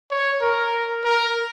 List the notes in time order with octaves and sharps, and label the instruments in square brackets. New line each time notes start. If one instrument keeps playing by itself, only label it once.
[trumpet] C#5
A#4
A#4